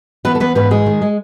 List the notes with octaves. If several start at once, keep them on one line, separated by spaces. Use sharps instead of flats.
E3 B3 B4
A4
E3 B3 B4
G#2 B3 B4
E3 G#3 G#4
D#3
G#3